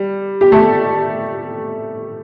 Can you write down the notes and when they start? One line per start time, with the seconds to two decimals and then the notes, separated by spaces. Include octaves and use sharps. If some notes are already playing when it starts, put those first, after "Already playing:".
Already playing: G3
0.41 G4
0.52 A3 A4